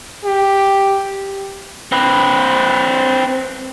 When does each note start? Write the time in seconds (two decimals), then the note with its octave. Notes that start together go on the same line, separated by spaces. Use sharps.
0.25 G4
1.92 C4 B4